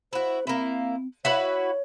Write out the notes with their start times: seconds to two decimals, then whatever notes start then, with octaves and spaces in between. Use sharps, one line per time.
0.13 E4 F#4 C5
0.47 A#3 C4 E4
1.25 E4 F#4 B4 C#5